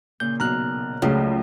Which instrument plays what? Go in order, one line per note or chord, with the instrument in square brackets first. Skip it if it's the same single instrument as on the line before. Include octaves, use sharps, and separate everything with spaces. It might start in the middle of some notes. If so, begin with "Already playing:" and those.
[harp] A#2 C#3 [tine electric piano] G6
[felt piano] B1 [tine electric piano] A#5 F6 F#6
[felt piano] C#2 [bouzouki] C#3 [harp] F3 F#3 A3